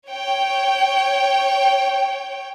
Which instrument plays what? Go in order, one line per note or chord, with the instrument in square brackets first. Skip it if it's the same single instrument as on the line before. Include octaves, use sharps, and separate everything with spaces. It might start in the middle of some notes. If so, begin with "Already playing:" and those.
[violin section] C#5 G5